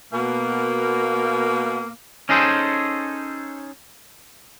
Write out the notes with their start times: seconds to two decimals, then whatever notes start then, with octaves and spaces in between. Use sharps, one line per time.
0.12 B2 A#3
2.29 C#4 D#4 G#4 A4 C5